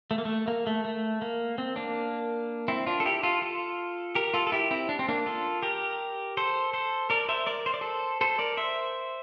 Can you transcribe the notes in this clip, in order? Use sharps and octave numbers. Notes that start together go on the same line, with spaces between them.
A3
A#3
A3
A#3
A3
A3
A#3
C4
A#3 D4
C4 E4
D4 F4
A4
E4 G4
F4 A4
F4 A4
G4 A#4
F4 A4
A4
E4 G4
C4 E4
D4
C4
A#3 D4
F4 A4
G4 A#4
A4 C5
A4 C5
A#4 D5
C5 E5
A#4 D5
C5
D5
A4 C5
A4 C5
A#4 D5
C5 E5